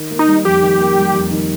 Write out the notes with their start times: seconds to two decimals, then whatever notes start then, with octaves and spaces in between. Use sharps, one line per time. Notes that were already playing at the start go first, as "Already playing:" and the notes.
Already playing: D#3
0.11 A#3
0.19 D#4
0.28 G3
0.45 F2 G4
0.62 D#3
0.79 A#3
0.97 G3
1.14 F2
1.31 D#3